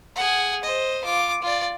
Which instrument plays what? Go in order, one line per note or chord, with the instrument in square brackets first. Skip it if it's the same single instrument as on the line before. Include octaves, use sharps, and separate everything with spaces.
[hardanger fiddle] G#4 F#5
C5 D#5
F4 D6
F4 D5